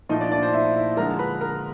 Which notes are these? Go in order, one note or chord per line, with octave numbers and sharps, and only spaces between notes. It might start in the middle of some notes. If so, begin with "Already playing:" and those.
A#2 F3 A3 D#4 D#5
D4 D5
D4 D5
C5
E4 E5
E4 E5
D3 F3 G#3 A#4 A#5
B4 B5
A#4 A#5